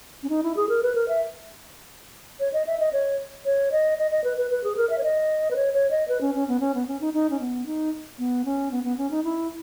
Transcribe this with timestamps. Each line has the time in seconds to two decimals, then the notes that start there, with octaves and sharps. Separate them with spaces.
0.23 C#4
0.29 D#4
0.43 E4
0.56 G#4
0.69 A#4
0.83 B4
0.95 A#4
1.08 E5
2.40 C#5
2.53 D#5
2.67 E5
2.80 D#5
2.93 C#5
3.45 C#5
3.72 D#5
3.98 D#5
4.11 D#5
4.24 B4
4.37 B4
4.51 B4
4.64 G#4
4.77 A#4
4.90 E5
4.98 C#5
5.03 D#5
5.51 B4
5.56 C#5
5.74 C#5
5.91 D#5
6.08 B4
6.21 C#4
6.35 C#4
6.48 B3
6.60 C#4
6.74 B3
6.88 C#4
7.01 D#4
7.14 D#4
7.30 C#4
7.40 B3
7.66 D#4
8.18 B3
8.45 C#4
8.71 B3
8.84 B3
8.98 C#4
9.11 D#4
9.24 E4